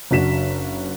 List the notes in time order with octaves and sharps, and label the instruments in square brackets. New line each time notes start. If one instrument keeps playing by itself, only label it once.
[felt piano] F#1 D4 F#4 B6 E7